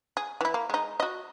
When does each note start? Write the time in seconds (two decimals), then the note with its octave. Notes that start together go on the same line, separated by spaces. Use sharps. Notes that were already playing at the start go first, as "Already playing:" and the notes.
0.17 G#4
0.41 E3 E4
0.54 A#3
0.70 G#3 D#4
1.00 F#4 D#5